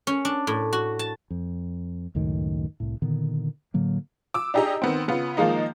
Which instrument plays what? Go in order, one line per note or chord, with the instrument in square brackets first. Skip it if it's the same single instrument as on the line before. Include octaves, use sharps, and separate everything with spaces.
[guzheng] C#4
D4
A2
F#4
A5
[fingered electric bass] F2
C#2 F#2 A2 D#3
C2 A2
A#2 D3 D#3 B3
A2 D3 F#3 A#3
[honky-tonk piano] D6 E6
D4 D#4 G4 G#4 D#5 A#5
D#3 B3 C4
C#3 B3 F4
D#3 F3 G#3 A#3 D#4